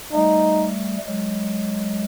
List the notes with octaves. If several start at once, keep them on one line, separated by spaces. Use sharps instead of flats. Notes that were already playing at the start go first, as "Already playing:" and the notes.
G3 A3 D#4
F#3 G#3